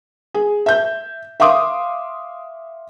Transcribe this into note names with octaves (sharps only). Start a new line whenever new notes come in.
G#4
E5 G6
E5 F5 C6 D6 D#6